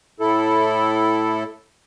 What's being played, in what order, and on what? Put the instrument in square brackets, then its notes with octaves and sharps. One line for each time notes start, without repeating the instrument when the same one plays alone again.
[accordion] A2 E4 A4